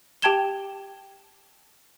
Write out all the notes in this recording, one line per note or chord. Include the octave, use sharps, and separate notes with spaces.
G4 G5 A5 G#6 E7 G7